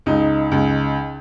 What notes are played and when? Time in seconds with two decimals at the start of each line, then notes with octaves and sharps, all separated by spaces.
0.06 C#2 D#4
0.52 C#2